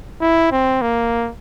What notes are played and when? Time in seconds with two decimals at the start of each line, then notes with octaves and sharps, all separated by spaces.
0.21 E4
0.52 C4
0.82 A#3